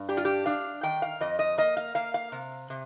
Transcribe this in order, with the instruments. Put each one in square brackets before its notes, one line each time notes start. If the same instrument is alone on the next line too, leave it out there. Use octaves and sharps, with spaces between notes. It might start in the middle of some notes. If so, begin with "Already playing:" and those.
Already playing: [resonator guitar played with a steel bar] G2
D4 G4
F4
G4
D4 F5
D#3 G5
F5
F2 D#5
D#5
A#3 D#5
F5
A#3 F5
F5
C3
C3